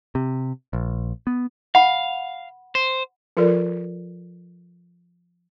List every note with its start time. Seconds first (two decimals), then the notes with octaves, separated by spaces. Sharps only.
0.15 C3
0.73 A#1
1.27 B3
1.75 F5 F#5 B5
2.75 C5
3.37 F3 F4 A4 A#4 D5